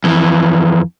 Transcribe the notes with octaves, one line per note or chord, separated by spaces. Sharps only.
F2 E3